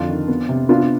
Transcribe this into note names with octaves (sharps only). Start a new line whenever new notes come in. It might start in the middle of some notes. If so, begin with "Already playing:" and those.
Already playing: F2 D3 D4 F4
D#3
B3
C3
B3 D4 F4